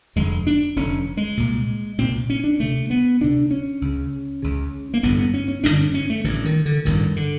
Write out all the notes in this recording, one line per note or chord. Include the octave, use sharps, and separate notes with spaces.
F1 F2 D3 G#3
D4
F1 F2 D3 C#4
G#3
C2 A#2
C2 A#2 C4
C#4
D4
D2 C3 A3
B3
D2 C3 D4
C#4
C#2 C#3
C#2 C#3
A#3
A1 G2 D3 B3
B3
C#4
C#4
A1 G2 D3 D4
C#4
C#4
A3
A1 G2 D3 E3
D#3
D3
A1 G2 D3 D#3
D3